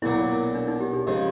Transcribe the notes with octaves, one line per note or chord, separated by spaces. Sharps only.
B1 A#2 F#3 A#3 E4
D4
D#4
G4
G#4
C#3 F3 G#3 G4